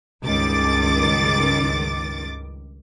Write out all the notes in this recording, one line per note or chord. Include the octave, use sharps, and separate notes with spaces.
C#2 G2 D#3 D6 A6